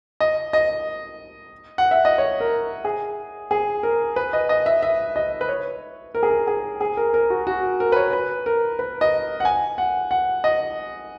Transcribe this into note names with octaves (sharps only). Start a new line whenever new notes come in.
D#5
D#5
F#5
E5
D#5
C#5
A#4
G#4
G#4
A#4
B4
D#5
D#5
E5
E5
D#5
B4
C#5
A#4
G#4
A#4
G#4
G#4
A#4
A#4
F#4
F#4
A#4
B4
C#5
B4
A#4
B4
D#5
F#5
G#5
F#5
F#5
D#5